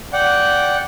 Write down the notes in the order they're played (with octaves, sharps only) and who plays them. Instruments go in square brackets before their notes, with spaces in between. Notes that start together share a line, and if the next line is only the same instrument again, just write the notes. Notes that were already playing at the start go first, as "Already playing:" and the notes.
[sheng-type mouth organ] D5 F#5 G5